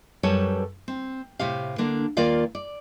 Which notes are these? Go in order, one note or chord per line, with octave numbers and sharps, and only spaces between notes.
F#2 G3 A4 B4 C#5 A5
C4
A2 C3 G4 F5
D3 A#3 D4
D#2 D#3 A#3 F4 D5 F5
D5